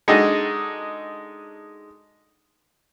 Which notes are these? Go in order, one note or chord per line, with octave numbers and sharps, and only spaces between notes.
G#3 D4 D#4 F#4 A4 D#5